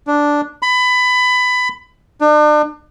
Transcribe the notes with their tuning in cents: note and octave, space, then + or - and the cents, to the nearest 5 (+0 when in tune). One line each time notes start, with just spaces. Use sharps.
D4 -5
B5 +20
D4 +40